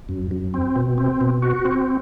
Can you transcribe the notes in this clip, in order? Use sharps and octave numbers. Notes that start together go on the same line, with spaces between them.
F#2
F#2
C4
B2
C4
B2
F#4
C4